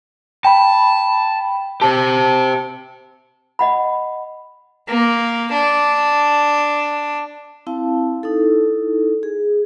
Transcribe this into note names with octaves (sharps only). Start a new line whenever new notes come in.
G5 A5 B5
G4 C5 A5
D#5 F#5 B5
A#3
D4
C4 E4 F5 A5
D#4 E4 A4
G#4